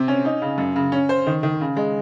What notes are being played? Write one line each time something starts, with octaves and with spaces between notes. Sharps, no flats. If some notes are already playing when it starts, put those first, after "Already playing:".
Already playing: C3 C4
C#4
D#4
C#3
F#2
C#3
C#4
C5
D#3
D#3
C#3
G#3